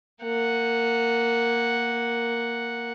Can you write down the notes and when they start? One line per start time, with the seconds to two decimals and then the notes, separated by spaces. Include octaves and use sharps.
0.22 A#3 F#5